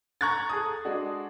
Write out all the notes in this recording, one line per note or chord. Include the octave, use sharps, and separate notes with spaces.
A#5 C#6 F#6 G#6 A6
G#4 A4 D#6
G#3 D4 F#4